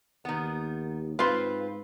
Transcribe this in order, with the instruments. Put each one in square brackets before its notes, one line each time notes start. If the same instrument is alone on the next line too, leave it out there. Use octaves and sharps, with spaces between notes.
[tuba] D#2 [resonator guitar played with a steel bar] D#3 B3
[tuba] G#2 [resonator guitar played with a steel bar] C4 F4 [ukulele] B4 [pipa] F5 C6